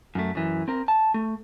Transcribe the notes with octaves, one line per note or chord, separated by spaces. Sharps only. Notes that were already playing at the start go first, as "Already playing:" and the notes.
F#2 A3
F#2 E3
C4 A#4
A5
A3